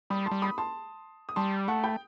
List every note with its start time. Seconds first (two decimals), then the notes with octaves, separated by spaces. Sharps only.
0.10 G3 B5 D#6
0.26 A5 C6
0.31 G3
0.42 B5 D#6
0.58 A5 C6
1.29 D#6
1.36 G3 A5 C6
1.68 A3 F#5 A5
1.84 G5 B5